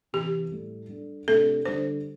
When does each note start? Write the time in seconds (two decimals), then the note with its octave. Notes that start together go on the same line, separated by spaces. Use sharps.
0.13 C3 E3 C4 E4 G4
0.51 A2 G3 E4 A4
0.89 G3 D4 A4
1.28 C3 A3 D4 G4 A4
1.65 D3 G3 D4 A4 C5